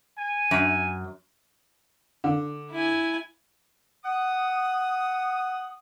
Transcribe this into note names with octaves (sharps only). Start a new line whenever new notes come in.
G#5
F#2
D3
E4 G#5
F#5 D#6